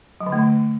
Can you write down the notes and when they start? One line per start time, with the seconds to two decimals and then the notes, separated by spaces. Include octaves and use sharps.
0.21 F#3
0.26 D3
0.32 A3
0.38 D3